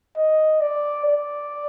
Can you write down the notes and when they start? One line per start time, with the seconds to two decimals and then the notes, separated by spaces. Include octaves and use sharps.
0.17 D#5
0.61 D5
1.06 D5